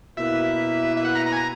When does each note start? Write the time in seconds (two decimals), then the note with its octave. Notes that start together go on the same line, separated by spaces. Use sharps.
0.17 B2 A#3 E4 B4 E5
0.97 E5
1.05 F#5
1.15 A#5
1.26 A#5
1.32 G#5
1.36 A#5